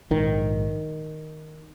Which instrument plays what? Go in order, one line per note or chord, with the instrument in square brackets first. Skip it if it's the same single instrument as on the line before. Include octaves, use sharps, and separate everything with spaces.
[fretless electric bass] A#1 G#2 D#3